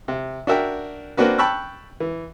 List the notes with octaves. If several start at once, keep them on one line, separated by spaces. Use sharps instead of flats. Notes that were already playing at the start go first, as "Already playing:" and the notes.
C3
D4 F#4 A#4 E5 G5
A#3 C4 D4 F#4 B4
G5 A5 B5 C#6 E6 F#6
E3